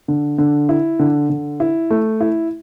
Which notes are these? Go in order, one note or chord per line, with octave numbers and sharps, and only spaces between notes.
D3
D3
E4
D3
D3
E4
A3
E4